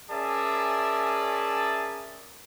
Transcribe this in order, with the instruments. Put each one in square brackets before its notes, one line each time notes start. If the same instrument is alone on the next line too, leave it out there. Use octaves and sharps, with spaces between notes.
[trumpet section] C#4 G#4 A#4 D5 E5 A5